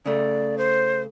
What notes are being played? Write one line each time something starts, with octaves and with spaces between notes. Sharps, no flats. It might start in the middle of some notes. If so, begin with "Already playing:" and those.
C#3 A3 D5
C5